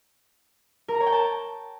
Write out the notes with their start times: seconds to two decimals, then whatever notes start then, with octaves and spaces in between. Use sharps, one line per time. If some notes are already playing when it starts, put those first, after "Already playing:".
0.88 A#4
0.94 A#5
1.00 C#5
1.06 G5
1.12 A5